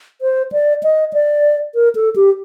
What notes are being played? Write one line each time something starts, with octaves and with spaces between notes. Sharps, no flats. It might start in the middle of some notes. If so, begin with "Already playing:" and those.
C5
D5
D#5
D5
A#4
A4
G4